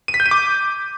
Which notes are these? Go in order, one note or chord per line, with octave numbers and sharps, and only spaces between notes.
D#7
B6
G6
D#7
D6